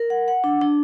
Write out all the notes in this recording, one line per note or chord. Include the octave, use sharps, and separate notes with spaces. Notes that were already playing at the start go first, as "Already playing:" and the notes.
Already playing: A#4
F#5
F#5
D4
D4